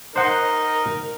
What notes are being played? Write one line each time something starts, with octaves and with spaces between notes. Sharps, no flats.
D#4 A#4 C5 F#5